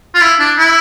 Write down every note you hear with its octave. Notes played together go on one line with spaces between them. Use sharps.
F4
E4
D4
E4